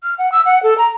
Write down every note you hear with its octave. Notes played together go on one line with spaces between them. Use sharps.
F6
F#5
E6
F#5
A4
A#5